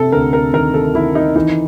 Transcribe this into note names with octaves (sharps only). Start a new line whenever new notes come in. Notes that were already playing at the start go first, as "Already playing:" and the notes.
Already playing: C3 A4
D2 A#4
A#4
D#3 A#4
A4
D#3 E4
D#4
E3 D#4